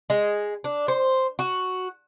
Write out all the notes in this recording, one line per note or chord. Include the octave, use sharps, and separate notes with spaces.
G#3
D4
C5
F#4